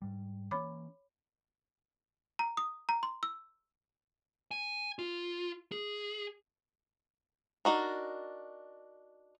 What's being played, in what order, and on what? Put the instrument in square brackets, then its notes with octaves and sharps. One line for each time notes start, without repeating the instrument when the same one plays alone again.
[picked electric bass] G#2 G3
[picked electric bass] E3 A#3 C#4 [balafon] C#5 B5 D6
[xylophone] A#5
D#6
A#5
C6
E6
[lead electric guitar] G#5
F4
G#4
[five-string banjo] D4 D#4 F#4 A#4